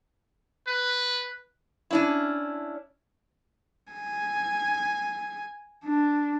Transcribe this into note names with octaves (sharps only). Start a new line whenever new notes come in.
B4
C#4 D4 E4
G#5
D4